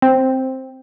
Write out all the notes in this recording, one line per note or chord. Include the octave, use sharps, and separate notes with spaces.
C4